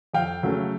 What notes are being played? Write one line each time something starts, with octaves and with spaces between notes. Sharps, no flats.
F2 F5 G5
C#3 F#3 A3 C#4